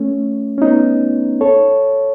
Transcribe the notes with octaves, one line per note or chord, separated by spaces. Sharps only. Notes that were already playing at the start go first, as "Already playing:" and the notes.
Already playing: A3 C#4
C#4
B3 D#4
A4 C#5